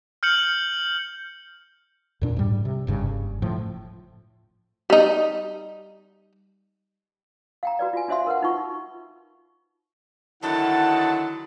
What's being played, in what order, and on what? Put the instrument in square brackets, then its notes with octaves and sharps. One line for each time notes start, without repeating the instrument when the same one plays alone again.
[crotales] F6 G6 C#7 F#7
[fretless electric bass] F2 A#2 D4
G#2 G3
C3
F#1 G2 C#3
A2 F3
[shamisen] G3 D#4
[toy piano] F5 G5 A#5
F#4 B4 D5
F4 G#5
D4 F#4 C5 E5 F5 C6
A#4 B4 F#5
D#4 F4 C#6
[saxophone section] D3 D#3 F#3 [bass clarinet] E4 [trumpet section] F#5 [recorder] A5